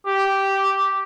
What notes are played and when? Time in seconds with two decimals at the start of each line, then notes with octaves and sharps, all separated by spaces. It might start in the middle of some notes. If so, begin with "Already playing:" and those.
0.07 G4